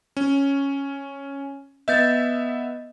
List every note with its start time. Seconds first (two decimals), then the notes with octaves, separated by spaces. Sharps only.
0.17 C#4
1.88 B3 D#5 E5 G6 A6